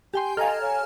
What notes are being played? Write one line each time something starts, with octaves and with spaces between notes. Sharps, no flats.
G4 G5 G#5 C6
A4 D#5 F5 G#5 A#5 F6
C#5